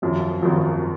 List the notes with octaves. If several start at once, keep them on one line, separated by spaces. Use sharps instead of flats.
G#1 F#2 F3
G#1 F#2 F3